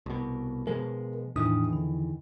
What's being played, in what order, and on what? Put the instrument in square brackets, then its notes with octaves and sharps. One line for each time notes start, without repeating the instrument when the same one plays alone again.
[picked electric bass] C2 B2
[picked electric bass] B2 F3 G#3 [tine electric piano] A#4
[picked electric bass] E2 D#3 E3 [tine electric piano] A2 D4 D#6
[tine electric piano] D3